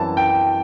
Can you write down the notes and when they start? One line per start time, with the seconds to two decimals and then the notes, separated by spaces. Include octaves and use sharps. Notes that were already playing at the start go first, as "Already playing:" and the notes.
Already playing: F#2 E3 G3 C4 E4 A5
0.17 G5